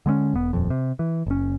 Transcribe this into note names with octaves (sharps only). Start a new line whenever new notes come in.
D3 G#3 A3 C#4
E1 B3
D#1 F2
C3
E3
F#1 C#4